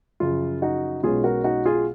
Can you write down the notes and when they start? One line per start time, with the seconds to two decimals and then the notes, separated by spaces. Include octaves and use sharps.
0.20 F#2 C#3 F3 F4
0.62 D#4 F#4
1.03 B1 B2 G#3 C#4 F4 G#4
1.24 F#4 A#4
1.44 D#4 F#4
1.65 F4 G#4